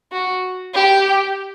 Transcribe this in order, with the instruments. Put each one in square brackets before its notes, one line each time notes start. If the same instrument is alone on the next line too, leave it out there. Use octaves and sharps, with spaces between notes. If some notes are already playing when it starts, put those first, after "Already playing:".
[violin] F#4
G4